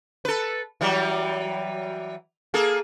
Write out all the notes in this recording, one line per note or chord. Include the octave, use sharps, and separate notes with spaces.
A4 B4
E3 F#3 G3
A#3 G#4 A4